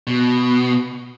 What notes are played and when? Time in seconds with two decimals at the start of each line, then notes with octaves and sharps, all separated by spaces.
0.07 B2